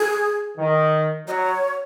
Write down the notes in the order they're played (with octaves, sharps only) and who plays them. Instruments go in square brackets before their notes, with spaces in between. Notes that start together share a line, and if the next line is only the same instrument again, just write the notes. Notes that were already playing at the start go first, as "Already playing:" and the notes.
Already playing: [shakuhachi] G#4
[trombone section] D#3
[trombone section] F#3 [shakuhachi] D#5
[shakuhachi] C#5